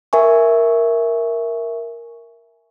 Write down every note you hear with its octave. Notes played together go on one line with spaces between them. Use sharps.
A#4 E5 G#5 C#6